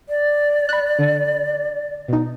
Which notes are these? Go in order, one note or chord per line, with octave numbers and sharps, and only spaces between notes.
D5
B5 F#6
D3
B2 D#4